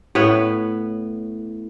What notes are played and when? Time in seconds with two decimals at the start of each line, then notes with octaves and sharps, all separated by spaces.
0.15 A2 B3 B4 C#5